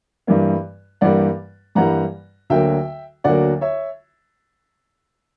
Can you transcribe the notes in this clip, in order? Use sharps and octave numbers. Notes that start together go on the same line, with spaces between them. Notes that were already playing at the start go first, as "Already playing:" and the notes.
G2 E3 G3 A#3
G2 E3 G3 A#3 D5 F#5
G2 E3 G3 A#3 F#5 A#5
D2 D3 F#3 A#3 E5 G5
D2 D3 F#3 A#3 D5 F#5
C#5 E5